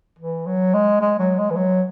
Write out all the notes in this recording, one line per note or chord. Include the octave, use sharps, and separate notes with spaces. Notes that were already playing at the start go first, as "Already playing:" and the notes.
E3
F#3
G#3
G#3
F#3
G#3
E3
F#3